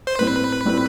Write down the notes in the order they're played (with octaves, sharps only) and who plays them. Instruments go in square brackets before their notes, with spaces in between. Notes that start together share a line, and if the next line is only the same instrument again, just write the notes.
[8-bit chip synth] C5
[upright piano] A2 G3 C4 [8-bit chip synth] B4
[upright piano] A2 G3 C4